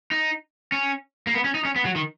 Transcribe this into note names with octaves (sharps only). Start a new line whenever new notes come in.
D#4
C#4
A#3
B3
C#4
D#4
C#4
B3
F#3
D#3